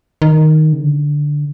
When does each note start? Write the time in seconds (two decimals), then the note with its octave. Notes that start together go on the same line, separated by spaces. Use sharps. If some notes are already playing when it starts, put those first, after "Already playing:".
0.22 D#3
0.73 C#3
0.82 D3